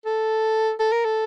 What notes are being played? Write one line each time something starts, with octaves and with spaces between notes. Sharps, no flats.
A4
A4
A#4
A4